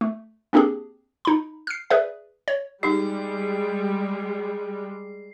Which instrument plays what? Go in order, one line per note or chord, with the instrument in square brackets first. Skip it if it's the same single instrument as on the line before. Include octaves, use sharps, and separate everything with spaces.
[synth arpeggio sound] A3
A#3 C4 D4 G4 G#4
D#4 B5
F6 C7
G#4 B4 D5 E5
C#5
[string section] G3 G#3 [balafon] D#4 G4 [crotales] C7